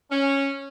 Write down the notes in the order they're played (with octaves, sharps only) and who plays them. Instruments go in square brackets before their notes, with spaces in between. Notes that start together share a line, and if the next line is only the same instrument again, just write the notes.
[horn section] C#4